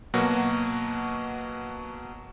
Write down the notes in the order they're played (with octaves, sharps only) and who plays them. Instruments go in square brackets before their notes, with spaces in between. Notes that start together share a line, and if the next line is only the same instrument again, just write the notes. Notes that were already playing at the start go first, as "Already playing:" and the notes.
[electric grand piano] B2 F#3 A#3 F#4